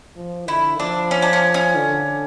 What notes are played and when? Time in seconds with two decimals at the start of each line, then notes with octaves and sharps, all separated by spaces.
0.16 F3
0.48 D3 E4
0.79 F3 D4
1.11 C#4
1.22 D4
1.33 C#4
1.54 C#4
1.75 D3